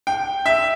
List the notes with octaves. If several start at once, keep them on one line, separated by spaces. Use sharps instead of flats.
G5
E5